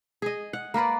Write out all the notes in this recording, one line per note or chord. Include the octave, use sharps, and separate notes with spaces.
G#4 D#5
F#5
A#3 A#4 B4 D5